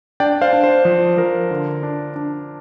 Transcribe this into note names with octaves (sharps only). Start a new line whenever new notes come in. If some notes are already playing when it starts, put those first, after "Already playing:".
D4 D5 G5
C5 F5
D4
C5
F3
F3 A#4
D3
D4
D4